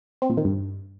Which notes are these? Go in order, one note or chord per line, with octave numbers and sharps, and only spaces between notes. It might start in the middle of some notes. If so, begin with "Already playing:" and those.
C4
A#2
D#3
G2